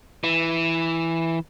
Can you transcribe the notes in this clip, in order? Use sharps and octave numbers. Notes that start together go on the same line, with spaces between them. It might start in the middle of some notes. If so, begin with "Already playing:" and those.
E3